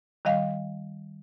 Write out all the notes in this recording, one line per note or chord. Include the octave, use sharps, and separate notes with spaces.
D#3 G3 D#5 F5